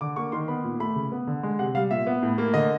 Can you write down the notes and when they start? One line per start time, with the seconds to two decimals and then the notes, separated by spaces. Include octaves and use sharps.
0.01 D3 D6
0.16 A#3 C#6
0.32 D#3 C6
0.48 B3 B5
0.64 A#2
0.80 A3 B5
0.96 C#3
1.12 B3
1.27 D3
1.43 G#3
1.59 C3 F#5
1.75 G3 F5
1.91 A#2 E5
2.07 B3
2.23 A2
2.38 A#3
2.54 D3 D#5